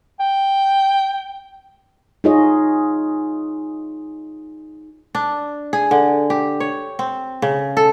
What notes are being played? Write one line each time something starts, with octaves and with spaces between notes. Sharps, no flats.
G5
D#4 F4 G#4 C#5 D#5
D4
G#4
D3
G4
C#5
C4
C#3
A4